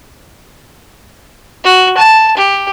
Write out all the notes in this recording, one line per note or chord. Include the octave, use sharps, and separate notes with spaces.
F#4
A5
G4